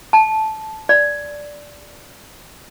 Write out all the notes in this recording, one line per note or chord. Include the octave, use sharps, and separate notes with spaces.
A5
D5